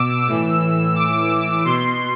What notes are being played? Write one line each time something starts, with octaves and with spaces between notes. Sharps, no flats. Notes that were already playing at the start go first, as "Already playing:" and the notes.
Already playing: B2 D6 E6
A2 E3
D6
B2 C6